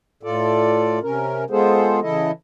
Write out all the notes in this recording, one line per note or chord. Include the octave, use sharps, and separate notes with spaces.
A2 F4 A4 D5
C3 C#4 A#4
G#3 B3 F4 G#4 A4 C5
C#3 E3 E4 A4 D#5